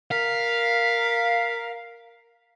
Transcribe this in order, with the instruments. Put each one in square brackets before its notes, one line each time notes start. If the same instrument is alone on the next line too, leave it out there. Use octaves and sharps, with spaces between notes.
[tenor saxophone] A#4 [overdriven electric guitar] F5 [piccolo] B6